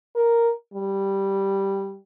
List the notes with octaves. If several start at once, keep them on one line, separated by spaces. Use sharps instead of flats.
A#4
G3